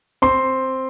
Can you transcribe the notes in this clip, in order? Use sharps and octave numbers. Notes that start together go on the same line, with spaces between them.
C4 C6